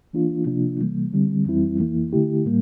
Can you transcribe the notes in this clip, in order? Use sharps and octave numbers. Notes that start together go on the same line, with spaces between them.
E3 A#3 D4 F4
C3 F3 A#3 D4 F4
C3 E3 G3 A#3
D3 G3 C4
F2 E3 G3 C4 E4
F2 E3 A#3 E4
D3 A3 E4 G4
A2 G3 A#3